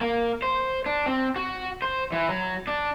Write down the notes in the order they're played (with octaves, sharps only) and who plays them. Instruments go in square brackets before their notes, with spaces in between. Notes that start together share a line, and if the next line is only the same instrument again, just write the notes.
[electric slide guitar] A#3
C5
D4
C4
F#4
C5
E3
F#3
D4